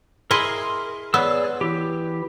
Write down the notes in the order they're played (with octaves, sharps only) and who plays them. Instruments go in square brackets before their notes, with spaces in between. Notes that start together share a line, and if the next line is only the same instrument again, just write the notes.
[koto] E4 G#4 D#5 [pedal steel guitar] A#4 C6
[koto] B3 [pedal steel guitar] G#4 E6 [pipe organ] C#5 D5
[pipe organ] E3 E4 [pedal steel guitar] G4